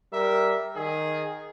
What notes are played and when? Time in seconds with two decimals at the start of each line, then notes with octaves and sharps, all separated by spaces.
0.12 G3 A#4 E5
0.75 D#3 G#4